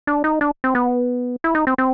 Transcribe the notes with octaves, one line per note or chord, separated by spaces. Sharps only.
D4
D#4
D4
C4
B3
E4
D#4
C4
C4